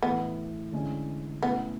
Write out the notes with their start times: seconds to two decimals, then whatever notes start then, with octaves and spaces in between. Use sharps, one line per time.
0.02 A2 E3 A3 B3
0.72 D3 G#3 C#4 E4
1.42 B2 A3 B3 C#4 E4